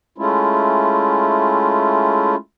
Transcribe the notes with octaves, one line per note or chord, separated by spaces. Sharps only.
G#3 A3 C#4 E4 F4